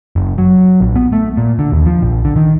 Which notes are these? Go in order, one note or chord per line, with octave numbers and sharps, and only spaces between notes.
F#1
F#3
A#1
B3
A3
A#2
D3
D#2
F3
A#1
D3
D#3